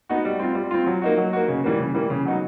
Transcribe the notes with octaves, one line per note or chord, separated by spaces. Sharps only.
B3 D#4 F#4
G3
C4 F4
G3
C4 F4
F#3
A#3 D#4 F#4
F#3
A#3 D#4 F#4
C#3
E3 G3 A#3
C#3
E3 G3 A#3
C#3
F#3 B3 D#4 F#4